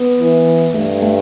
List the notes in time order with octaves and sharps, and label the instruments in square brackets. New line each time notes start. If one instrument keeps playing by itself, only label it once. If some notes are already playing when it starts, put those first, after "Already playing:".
Already playing: [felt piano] B3
[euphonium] E3
[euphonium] G2 [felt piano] A3
[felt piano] A3